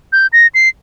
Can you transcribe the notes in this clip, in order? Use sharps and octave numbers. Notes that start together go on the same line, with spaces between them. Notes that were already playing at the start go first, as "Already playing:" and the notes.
G6
A#6
C7